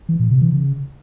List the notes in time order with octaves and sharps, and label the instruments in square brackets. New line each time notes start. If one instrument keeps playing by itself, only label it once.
[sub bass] E3
A#2
C3
E3
C#3